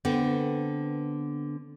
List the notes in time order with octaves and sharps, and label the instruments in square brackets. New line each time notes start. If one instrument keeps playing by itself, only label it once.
[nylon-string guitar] D3 B3 C4